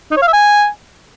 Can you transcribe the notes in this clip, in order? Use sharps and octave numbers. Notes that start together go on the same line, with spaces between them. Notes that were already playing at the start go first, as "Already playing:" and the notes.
D#4
C#5
F5
E5
G#5